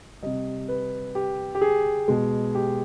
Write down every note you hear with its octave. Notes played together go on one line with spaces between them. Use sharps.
C3 G3 D#5
B4
G4
G4
G#4
B2 G#3
G4